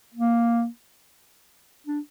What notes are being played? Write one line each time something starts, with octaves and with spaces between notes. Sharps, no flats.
A#3
D4